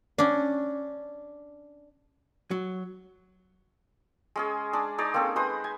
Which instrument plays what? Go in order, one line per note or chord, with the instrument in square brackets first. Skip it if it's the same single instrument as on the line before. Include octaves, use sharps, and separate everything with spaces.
[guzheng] C#4 D4
[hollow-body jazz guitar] F#3
[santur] G#3 C#4 G#4
G#3 D4
D#4 G#4 C#5 D5
A#3 C4 C#4 A4
G#3 B4 C5 D#6
G#5